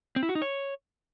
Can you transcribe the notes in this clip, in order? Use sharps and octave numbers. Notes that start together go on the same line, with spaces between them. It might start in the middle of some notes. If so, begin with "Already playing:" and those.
C4
E4
F#4
D#4
C#5